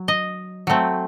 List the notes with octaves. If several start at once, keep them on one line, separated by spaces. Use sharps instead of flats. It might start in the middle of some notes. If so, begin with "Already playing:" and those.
Already playing: F#3
D#5
F#3 A3 C4